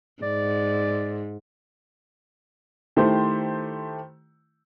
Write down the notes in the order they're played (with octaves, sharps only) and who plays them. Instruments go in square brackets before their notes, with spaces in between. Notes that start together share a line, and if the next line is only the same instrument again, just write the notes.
[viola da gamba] G#2 [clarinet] D5
[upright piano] D#3 A3 E4 G4 C5